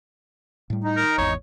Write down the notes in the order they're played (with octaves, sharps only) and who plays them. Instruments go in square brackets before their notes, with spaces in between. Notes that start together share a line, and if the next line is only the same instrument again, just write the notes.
[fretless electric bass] A2 G3
[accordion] D#4
[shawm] A#4
[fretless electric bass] G#1 E2 [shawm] C#5